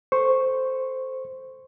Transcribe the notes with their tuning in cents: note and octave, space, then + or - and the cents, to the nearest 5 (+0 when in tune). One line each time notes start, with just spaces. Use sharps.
A4 +0 C5 -5 C#6 -10